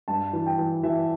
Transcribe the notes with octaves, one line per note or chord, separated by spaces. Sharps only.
G2 A5
E3
G5
E3
E3 E5